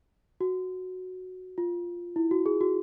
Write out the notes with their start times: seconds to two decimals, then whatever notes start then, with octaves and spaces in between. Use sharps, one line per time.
0.41 F#4
1.58 F4
2.16 E4
2.31 F#4
2.46 G#4
2.61 F#4